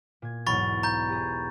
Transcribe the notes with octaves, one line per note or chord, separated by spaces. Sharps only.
A#2 G#6
B1 E2 G#2 B5 C#6 A6
A#5 G6
G4 G#4